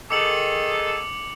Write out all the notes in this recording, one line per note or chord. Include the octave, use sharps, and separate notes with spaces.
D#3 G#4 A4 D6 C#7 F#7